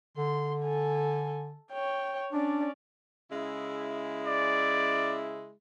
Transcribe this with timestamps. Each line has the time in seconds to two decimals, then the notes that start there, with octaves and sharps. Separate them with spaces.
0.17 D3 C6
0.64 A4 G#5
1.73 C#5 G5
2.33 C#4 D4 D5
3.31 C#3 G#3 E4
4.26 D5